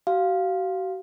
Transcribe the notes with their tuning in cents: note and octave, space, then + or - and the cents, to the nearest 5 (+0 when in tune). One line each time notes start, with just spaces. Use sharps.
F#4 +40 F5 +0